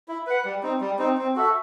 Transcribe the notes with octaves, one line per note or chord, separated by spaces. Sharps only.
E4
B4 F#5
G3
C4 D#4
G3
C4 D#4
C4
F#4 A4 E5